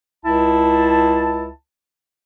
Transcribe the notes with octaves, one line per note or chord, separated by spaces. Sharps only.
C#2 E4 A5